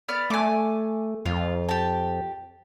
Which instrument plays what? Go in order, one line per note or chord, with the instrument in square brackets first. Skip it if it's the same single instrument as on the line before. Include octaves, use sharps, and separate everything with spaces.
[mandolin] B3 D5 F6
[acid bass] A3 [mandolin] G#5 D6
[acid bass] F2 [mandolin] F4
[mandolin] G4 A5